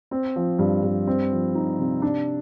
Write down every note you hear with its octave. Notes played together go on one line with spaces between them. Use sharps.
C4
F3
G2
G2
C4
F3
D#4
C3
D4